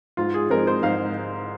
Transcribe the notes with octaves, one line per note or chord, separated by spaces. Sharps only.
G#2 F4
G#4
F3 G#3 C4 A#4
C5
G#2 F5